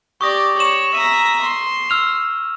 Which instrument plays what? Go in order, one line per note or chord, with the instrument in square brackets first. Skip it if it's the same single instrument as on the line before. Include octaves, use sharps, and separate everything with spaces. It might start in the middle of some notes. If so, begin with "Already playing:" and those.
[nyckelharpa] G4 D5 [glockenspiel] C#6 D#6 A#6
[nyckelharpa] C#5 [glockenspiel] E7 F#7
[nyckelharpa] E5 A#5 [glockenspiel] D#7
[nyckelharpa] C6
[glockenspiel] E6 F6 F7